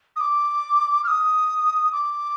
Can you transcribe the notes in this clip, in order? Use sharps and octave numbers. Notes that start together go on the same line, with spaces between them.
D#6
D6
F6
D#6
D6